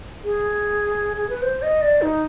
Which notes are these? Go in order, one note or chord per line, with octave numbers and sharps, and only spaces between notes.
G#4
G#4
B4
C5
D#5
D5
D#4